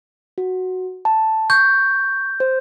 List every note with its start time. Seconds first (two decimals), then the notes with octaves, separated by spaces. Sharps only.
0.38 F#4
1.05 A5
1.50 C#6 G6
2.40 C5